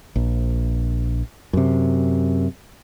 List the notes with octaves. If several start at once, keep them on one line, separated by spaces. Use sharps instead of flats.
A#1
F#2 C3